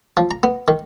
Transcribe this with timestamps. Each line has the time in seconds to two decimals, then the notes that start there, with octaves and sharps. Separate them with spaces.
0.17 F3
0.31 A#5
0.43 B3
0.68 D#3